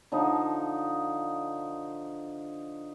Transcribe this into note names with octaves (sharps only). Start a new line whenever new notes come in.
D3 F3 D#4